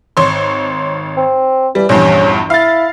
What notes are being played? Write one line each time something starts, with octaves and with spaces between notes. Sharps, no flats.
G#1 C#5 C6
C4
E3 G3
A#1 E2 G2 C#4
E4 F5 A6